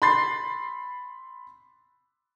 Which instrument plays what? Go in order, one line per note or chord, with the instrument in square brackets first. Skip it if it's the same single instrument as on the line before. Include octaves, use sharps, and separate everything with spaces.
[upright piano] B5 C6 A6 C7